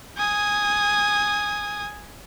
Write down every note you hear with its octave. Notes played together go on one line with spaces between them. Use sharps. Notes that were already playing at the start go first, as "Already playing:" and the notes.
G#5 D#6